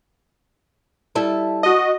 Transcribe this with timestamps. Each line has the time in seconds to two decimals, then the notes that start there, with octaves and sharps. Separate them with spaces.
1.15 G3 E4 A4
1.63 F#4 D#5